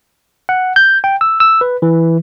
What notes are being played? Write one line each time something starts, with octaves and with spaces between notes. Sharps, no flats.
F#5
G6
G5
E6
E6
B4
E3